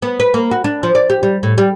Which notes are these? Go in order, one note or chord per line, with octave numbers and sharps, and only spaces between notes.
B3
B4
A#3
F#4
D4
F3
D5
G4
G3
A2
G3